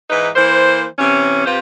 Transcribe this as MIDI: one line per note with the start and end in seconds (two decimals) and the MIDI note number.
0.10 0.29 44
0.10 0.29 52
0.10 0.29 63
0.10 0.29 71
0.36 0.85 52
0.36 0.85 58
0.36 0.85 72
0.99 1.45 48
0.99 1.45 52
0.99 1.45 61
1.46 1.59 48
1.46 1.59 65
1.46 1.59 67
1.46 1.59 71
1.46 1.59 72